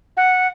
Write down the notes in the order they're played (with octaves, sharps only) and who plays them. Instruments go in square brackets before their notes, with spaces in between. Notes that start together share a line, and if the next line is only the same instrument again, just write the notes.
[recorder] F#5